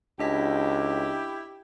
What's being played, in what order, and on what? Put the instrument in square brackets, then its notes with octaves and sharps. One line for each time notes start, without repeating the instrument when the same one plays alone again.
[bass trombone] C#2 [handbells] D4 D#5 B6 [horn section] E4 G4